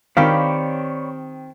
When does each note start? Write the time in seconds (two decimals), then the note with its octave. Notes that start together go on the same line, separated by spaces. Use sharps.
0.17 D#3 C4 G4 C#5 D5 F5 B5